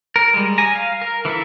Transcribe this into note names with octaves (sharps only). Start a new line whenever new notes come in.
A#4
G3 G#3
G#5 A#5
F5
A#4
E3 E4 A4 E5